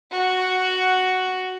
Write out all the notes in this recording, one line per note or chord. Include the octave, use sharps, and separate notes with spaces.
F#4